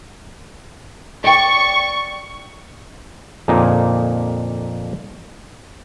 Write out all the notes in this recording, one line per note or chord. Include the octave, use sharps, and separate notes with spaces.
D5 G5 C#6
F2 A#2 D3 A#3 D#4 G#4